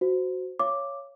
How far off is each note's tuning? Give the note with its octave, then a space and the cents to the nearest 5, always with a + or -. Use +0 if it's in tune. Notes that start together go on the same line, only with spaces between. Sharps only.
F#4 +0 C5 -20
C#5 +0 F5 -30 D6 +0